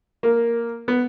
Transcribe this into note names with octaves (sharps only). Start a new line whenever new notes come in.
A#3
B3